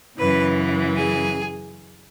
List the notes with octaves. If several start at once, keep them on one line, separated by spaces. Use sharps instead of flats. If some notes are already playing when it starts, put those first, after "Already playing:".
F#2 C#3 E3 B4
G#4